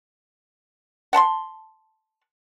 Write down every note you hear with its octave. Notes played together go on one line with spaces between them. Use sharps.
F#5 A5 B5 C6